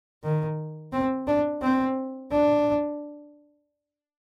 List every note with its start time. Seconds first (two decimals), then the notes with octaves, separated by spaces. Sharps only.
0.23 D#3
0.93 C4
1.27 D4
1.62 C4
2.31 D4